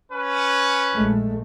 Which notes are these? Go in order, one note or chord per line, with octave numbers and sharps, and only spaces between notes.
C#4 B4
A#1 G#3 A3